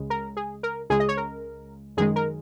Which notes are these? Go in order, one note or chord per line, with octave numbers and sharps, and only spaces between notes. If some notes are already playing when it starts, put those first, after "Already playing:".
Already playing: C#2 C#3 G#3
A#4
G#4
A#4
C#2 C#3 G#3 G#4
D#5
C#5
A#4
F#2 D#3 G#3 G#4
A#4